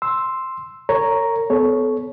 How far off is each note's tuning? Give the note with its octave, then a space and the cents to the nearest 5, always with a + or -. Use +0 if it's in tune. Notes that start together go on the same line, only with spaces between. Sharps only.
C6 +0 E6 +0
A#4 -35 C#5 +0 A#5 +0
B3 +35 A4 -30 C#5 +0